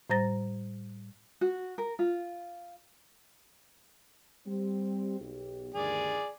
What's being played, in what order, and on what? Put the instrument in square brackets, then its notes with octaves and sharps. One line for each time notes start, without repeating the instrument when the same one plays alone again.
[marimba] A2 G3 C5 A#5 A6 A#6
[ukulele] F#4
A#4
F4
[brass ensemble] G3 C4
B1 G4
[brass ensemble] D2 G2 D#3 [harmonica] G#4 D5